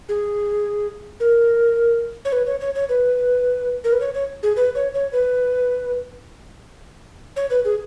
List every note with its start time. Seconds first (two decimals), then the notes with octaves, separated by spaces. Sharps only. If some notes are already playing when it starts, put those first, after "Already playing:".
0.09 G#4
1.20 A#4
2.25 C#5
2.32 B4
2.46 C#5
2.61 C#5
2.75 C#5
2.89 B4
3.84 A#4
3.92 B4
4.01 C#5
4.14 C#5
4.43 G#4
4.56 B4
4.75 C#5
4.94 C#5
5.13 B4
7.36 C#5
7.50 B4
7.65 G#4